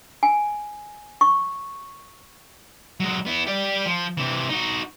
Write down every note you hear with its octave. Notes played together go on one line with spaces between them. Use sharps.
G#5
C#6
F#3 G#3
B3 E4
G4 D5
F3
C3 E3
D#4 F#4